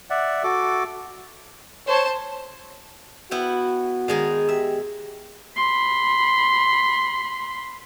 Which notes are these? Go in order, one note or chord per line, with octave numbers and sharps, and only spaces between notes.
D5 E5 F#5
F#4 A4 D6
C5 C#5 A5
B3 E4 F#4 G5
D#3 G#3 D#4
G4 E5
B5 C6